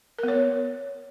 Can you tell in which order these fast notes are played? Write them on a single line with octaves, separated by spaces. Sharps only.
A#4 B3 C#5